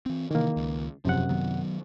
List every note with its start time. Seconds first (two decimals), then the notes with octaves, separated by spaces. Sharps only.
0.06 E3 C4
0.31 C3 D#3 E3 A#3
0.56 C#2
1.05 E1 C#2 F#2 C3 F3 F#5
1.29 D#3 F#3 B3